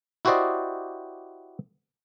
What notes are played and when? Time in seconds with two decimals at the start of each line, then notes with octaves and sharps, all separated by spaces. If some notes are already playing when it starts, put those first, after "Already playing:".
0.25 E4 F#4 G4 C5 D5 D#5